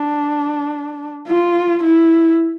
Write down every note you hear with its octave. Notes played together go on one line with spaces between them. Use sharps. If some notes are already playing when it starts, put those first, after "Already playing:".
Already playing: D4
F4
E4